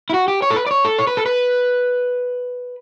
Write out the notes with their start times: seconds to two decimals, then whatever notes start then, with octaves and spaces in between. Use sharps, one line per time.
0.10 E4
0.14 F#4
0.28 G4
0.42 C#5
0.50 A4
0.56 B4
0.66 D5
0.71 C#5
0.85 A4
0.99 C#5
1.07 B4
1.17 A4
1.26 B4